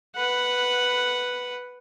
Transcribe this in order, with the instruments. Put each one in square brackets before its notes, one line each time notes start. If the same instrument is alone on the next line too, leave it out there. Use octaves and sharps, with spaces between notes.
[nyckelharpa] B4 F#5